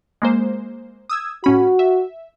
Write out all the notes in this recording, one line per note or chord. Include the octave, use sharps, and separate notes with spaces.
G#3 A#3 C5
D#6 E6 G#6
A2 C#4 F#4 B5
E5